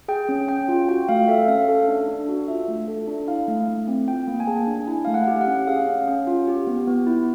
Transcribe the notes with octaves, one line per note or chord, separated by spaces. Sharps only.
G#4 G5
C#4
C#4 G5
F4
F#4 G5
A3 F5
A4 E5
C#4 F5
A4
D4
D4
F#4
F4 E5
A3
A4
D4
E4 F5
A3
A3
C4
F4 G5
A#3
G#5
G#4 A5
D4
E4 G#5
A3 F5
F#5
G4
F#5
C#4
G#4 F5
C#4
C#4
F4
G4
B3
B3
E4